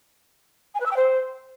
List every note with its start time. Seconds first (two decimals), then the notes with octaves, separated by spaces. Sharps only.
0.74 G#5
0.80 B4
0.85 E6
0.91 G5
0.96 C5